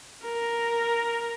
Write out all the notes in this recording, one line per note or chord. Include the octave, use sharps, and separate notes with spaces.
A#4